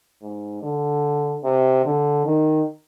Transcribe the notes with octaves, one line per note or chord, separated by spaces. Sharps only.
G#2
D3
C3
D3
D#3